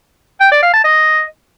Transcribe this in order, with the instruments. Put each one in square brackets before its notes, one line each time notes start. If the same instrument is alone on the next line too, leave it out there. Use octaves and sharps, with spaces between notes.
[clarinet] G5
D5
F5
A5
D#5